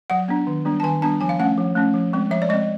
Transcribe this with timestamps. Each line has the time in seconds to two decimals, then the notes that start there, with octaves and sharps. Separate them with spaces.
0.10 F#3 F#5
0.28 B3 D4
0.47 D#3
0.65 G3 B3 D4
0.80 A5
0.84 D#3 G#5
1.02 G3 B3 D4 A5
1.21 F3 G#5
1.29 F5
1.39 A3 C#4 F#5
1.58 F3
1.76 A3 C#4
1.94 F3
2.13 G#3 C4
2.31 F3 E5
2.42 D5
2.49 G#3 D#5
2.53 C4